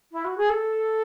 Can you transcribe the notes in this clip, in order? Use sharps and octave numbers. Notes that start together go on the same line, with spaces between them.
E4
F#4
G#4
A4